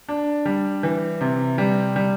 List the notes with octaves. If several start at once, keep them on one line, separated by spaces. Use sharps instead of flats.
D4
G3
E3
C3
G3
G3